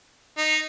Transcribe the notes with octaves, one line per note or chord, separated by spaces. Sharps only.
D#4